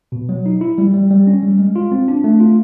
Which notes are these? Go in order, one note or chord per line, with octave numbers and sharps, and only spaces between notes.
B2
F#3
D#4
E4
G3
G3
G3
C#4
G3
G#3
F4
C4
D4
A3
F4